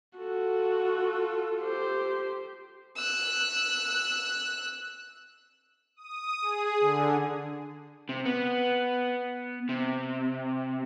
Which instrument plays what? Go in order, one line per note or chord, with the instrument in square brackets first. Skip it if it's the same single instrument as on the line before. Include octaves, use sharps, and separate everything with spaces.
[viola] F4 A4 [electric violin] F#4
[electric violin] G4 C5
[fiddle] E6 F#6
[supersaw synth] D#6
G#4
D3
[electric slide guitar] C3
B3
C3